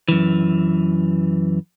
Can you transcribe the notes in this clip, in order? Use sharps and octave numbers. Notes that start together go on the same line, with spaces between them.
F#2 E3